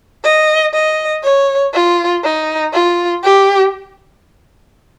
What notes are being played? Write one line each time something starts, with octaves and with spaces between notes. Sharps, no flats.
D#5
D#5
C#5
F4
D#4
F4
G4